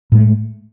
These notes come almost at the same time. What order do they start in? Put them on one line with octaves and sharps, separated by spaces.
A2 G#3 A3